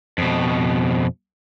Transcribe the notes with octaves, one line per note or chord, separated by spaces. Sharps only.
F2 B2